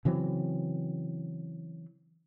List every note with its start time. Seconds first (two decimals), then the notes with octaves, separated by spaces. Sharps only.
0.05 C#3 E3 F#3 C4